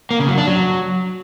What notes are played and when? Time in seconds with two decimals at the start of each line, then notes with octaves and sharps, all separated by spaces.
0.11 A#3
0.20 C#3
0.29 F#3
0.38 D4
0.47 F#3